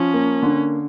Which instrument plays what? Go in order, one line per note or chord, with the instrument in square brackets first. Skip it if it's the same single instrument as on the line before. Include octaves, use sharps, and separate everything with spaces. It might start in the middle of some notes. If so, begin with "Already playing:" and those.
Already playing: [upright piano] F3 [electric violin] C#4
[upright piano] A#3
D3